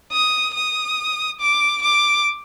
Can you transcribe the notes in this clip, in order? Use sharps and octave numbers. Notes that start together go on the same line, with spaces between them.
D#6
D#6
D6
D6